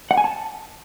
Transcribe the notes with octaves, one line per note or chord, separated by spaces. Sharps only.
F#5
G#5
A5